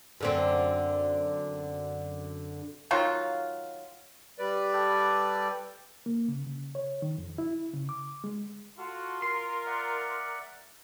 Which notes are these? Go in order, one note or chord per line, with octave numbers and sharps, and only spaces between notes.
F#2 D3 C4
D#3 F#3 F4
G3 B4 D5
A4 G5
A#3
C#3
C#3
C#5
D#3
F2
E4
C#3
D6
G#3
F4 F#4 A4
A#4 C6
D5 E5 F#5